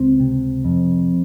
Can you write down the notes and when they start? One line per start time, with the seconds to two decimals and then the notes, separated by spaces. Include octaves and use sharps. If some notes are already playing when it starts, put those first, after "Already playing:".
Already playing: C#2 C4
0.20 C3
0.65 F2